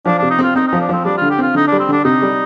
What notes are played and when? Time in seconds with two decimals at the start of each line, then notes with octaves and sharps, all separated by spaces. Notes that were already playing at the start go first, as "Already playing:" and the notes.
0.06 F3 D4
0.19 C3 D4
0.31 D#4
0.39 C4 F4
0.55 C4 D#4
0.68 F3 D#4
0.81 D4
0.89 F3 C4
1.05 G3 D4
1.17 D3 F4
1.30 G4
1.38 C4 F4
1.55 D3 D#4
1.67 G3 D4
1.80 C4
1.89 D3 D4
2.05 C3 D#4
2.22 G3